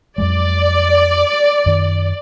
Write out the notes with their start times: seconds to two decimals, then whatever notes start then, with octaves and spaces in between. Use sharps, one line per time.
0.18 F2 F#3 G#3 D5
1.66 F#2 D#3